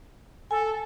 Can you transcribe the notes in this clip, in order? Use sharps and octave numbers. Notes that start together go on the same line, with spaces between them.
A4 G#5